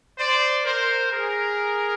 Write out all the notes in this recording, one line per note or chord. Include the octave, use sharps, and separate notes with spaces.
C5 D5
A#4 C5
G#4 A#4